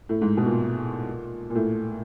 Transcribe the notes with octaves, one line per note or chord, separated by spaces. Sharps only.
A2
G#2
B2
A#2
A#2
A2